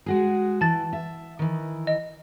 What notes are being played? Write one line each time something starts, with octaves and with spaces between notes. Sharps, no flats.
G#3 F#4 G#4
E3 A5 A6
E5
D#3 E3
D#5